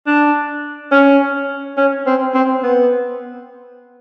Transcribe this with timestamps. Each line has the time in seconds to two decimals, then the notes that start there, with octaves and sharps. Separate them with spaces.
0.07 D4
0.92 C#4
1.77 C#4
2.06 C4
2.34 C4
2.63 B3